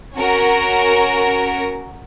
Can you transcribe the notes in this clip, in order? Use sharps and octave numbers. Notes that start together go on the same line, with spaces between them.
C#4 F#4 A#4